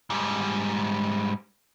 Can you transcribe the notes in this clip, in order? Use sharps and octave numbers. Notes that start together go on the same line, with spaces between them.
G#2 G3